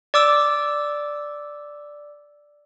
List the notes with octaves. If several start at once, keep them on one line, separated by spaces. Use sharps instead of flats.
D5 D6 E6